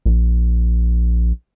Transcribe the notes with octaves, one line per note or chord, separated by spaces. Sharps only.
A#1